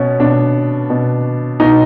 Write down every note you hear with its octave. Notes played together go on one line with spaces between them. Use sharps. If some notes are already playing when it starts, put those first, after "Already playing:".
Already playing: B2 B3 C#4
B2 D4
B2
B2 D#4